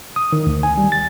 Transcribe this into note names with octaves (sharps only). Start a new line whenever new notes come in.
D#6
D#3
D2
G#5
G3
A6